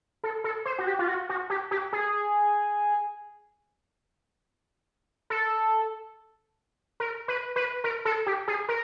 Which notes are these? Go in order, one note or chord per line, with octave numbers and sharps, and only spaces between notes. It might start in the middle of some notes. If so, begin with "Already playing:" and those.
A4
A4
C5
F#4
G4
F4
F#4
F#4
G4
G4
G#4
A4
A#4
B4
B4
A#4
A4
G4
G#4
A#4